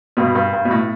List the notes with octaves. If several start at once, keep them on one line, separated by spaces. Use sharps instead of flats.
G2 B2
G2
G2
B2
A2